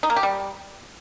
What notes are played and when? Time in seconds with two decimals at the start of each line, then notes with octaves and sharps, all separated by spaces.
0.03 D#4
0.10 A#3
0.16 G4
0.23 G3